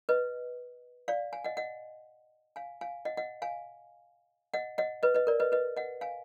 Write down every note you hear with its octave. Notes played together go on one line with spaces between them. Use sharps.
B4 D#5
D5 F5
F5 G#5
D#5 F#5
D#5 F#5
F5 G#5
F5 G#5
D#5 F#5
D#5 F#5
F5 G#5
D#5 F#5
D#5 F#5
B4 D#5
B4 D#5
A#4 D5
B4 D#5
B4 D#5
D#5 F#5
F5 G#5